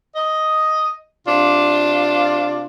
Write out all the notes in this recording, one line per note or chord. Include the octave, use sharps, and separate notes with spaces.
D#5
C3 D4 F4